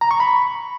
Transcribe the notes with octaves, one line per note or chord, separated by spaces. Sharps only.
A#5
C#6
B5